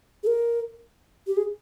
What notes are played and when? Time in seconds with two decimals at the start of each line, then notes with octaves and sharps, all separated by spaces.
0.23 G#4
0.27 A#4
1.27 G4
1.37 G#4